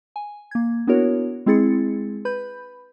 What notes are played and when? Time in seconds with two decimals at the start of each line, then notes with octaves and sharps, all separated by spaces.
0.16 G#5
0.51 A#3 G#6
0.87 B3 D4 E4 F#4 A#4 C#5
1.46 G#3 C4 E4 G#4 A6 C#7
2.25 B4 B5 G6